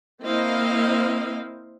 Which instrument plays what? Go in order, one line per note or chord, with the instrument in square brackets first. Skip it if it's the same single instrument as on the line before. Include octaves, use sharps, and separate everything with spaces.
[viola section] A#3 C4 E4 C5 D#5 F5